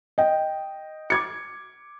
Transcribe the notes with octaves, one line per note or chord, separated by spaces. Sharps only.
D#5 G5
D6 G#6 C#7